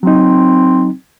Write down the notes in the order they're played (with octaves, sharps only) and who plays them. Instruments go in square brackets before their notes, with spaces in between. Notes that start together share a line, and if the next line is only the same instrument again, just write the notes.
[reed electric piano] F#3 D#4 [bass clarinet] C4